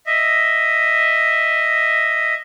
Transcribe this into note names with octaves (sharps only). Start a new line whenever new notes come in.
D#5 E5